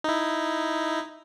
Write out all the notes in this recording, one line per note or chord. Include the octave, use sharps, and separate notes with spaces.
D#4 E4